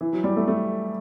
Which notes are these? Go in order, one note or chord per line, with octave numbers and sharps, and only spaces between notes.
E3
F#3
G3
A3
A3